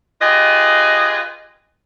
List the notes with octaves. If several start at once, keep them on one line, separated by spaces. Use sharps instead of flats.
F4 G4 G#4 B4 D#5